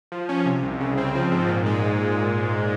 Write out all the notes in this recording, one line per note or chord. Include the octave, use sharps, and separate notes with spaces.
F3
C#4
C3
C2
C#3
C4
F3
G#2
A#2
G#3